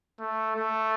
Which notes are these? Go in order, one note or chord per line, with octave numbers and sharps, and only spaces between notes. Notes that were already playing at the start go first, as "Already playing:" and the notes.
A3
A3